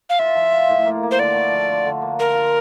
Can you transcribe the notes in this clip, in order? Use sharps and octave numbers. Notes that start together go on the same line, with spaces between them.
F5
F4 E5
F3
F4
A2
A#3
A#3
C5
D3 D5
A3
F3
D3
D3
A#3
F4 A#4
F4